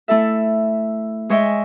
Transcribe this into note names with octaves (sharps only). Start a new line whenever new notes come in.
A3 E4 A4 E5
G#3 C#5 D#5 E5 G5